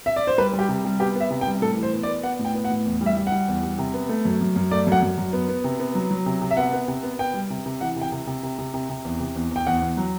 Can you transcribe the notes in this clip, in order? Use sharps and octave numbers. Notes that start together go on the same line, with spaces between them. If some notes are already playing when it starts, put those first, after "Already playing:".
E5
D5
C5
G3 B4
G3
G4
C3
G3
B3 G4
B3 E5
C3
G5
G3
A2 A4
E3
C5
B3
D5
B3
B3 F#5
A2
G5
B3
F#5
A2
E2
G3
E5
G3
F#5
G3
E2
G3
C3
B3
A3
F#2
F#2
F#2
A3 D5
F#2
F#5
F#2
F#2
B3
B3
C3
B3
F#3
F#3
C3
C3
E5
B3 F#5
B3
C3
B3
B3 G5
G3
C3
C3
E3 F#5
C3
G5
C3
C3
C3
C3
C3
C3
E2
C3
E2
E2 G5
E2 F#5
E2
F#3